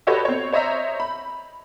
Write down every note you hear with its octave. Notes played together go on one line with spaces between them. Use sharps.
F#4 G4 A4 B4 C#5 D#5
C4 C#5
C5 C#5 D#5 E5 A#5
B5